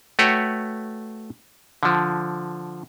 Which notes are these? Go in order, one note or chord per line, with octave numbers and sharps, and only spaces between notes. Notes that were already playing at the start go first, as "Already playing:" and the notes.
A3 F#4 B4 C#5 G5
D3 F3